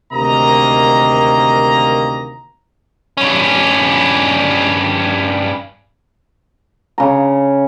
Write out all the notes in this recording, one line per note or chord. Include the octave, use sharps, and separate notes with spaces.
D2 C3 D#3 A#3 D#5 A#5
G2 C#4
C#3 A#5